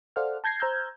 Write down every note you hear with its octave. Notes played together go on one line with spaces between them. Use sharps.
A4 C5 D5 F5 F#5 F6
A5 G6 G#6 A#6 C7
C5 A#5 E6 F6 G6 G#6